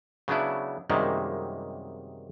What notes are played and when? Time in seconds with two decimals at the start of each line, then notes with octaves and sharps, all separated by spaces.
0.28 C#3 F#3 B3 D4 E4
0.90 F#2 C3 D#3 G3 G#3 A#3